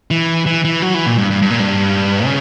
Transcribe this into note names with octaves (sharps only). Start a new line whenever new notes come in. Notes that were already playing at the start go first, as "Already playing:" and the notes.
E3
E3
E3
F#3
E3
A#2
G2
G2
G2
A#2
G2
C#3